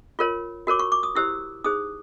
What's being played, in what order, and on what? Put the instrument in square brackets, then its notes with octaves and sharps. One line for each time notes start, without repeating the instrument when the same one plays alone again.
[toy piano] F4 A#4 C#5
F#4 A#4 C#5 D6
C#6
D6
D#6
E4 G4 C5 E6
D#4 G#4 C5 D#6